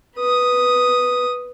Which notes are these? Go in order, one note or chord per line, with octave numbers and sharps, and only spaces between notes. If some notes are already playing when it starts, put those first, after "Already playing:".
B4 D#6